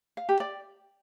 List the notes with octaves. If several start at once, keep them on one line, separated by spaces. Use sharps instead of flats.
F5
G4
D5